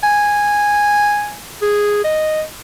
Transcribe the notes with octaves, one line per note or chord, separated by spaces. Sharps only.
G#5
G#4
D#5